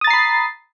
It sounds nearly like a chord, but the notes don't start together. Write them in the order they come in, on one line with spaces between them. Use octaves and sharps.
D#6 A6 A#5 C7 B5